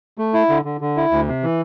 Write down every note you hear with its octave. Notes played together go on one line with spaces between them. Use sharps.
A3
E4
D3
D3
D3
E4
D2
C3
E3